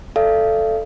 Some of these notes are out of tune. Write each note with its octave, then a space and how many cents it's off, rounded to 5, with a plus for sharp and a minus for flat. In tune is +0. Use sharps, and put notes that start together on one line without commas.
A4 +0 D5 +20 F5 -35